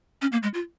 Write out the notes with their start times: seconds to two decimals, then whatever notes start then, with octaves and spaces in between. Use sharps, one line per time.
0.22 C#4
0.32 A#3
0.43 G#3
0.54 F4